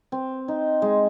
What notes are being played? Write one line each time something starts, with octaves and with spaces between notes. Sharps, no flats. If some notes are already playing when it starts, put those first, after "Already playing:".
C4
D#4
G#3